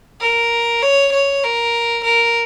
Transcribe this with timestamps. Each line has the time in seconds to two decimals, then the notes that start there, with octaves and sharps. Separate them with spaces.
0.21 A#4
0.82 C#5
1.13 C#5
1.44 A#4
2.04 A#4